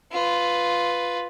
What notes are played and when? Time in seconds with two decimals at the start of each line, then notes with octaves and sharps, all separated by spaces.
0.12 F4 B4